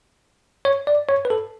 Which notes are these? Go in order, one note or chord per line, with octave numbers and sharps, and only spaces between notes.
C#5
D5
C#5
B4
A4